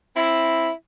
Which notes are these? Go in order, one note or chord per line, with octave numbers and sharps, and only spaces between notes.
C4 E4